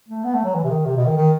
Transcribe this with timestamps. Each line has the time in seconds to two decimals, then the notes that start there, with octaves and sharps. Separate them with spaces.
0.08 A3
0.24 B3
0.35 A3
0.44 F#3
0.55 E3
0.64 C3
0.70 D#3
0.86 C3
0.96 B2
1.06 D#3
1.17 D#3